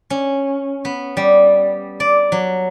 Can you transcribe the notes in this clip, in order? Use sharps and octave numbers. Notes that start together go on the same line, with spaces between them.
C#4
B3
G3
D5
F#3